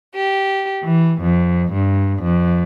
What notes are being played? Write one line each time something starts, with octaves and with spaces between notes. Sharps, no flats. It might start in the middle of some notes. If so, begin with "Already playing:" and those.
G4
E3
F2
G2
F2